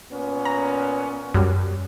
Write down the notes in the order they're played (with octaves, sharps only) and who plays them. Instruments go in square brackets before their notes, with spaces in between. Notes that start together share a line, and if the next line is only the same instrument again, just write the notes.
[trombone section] A#2 B3 C#4
[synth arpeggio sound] A#5
F#2 G3